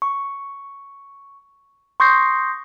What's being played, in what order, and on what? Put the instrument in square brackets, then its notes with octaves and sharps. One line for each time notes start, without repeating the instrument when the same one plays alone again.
[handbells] C#6
C6 C#6 D#6 G6 A#6 C7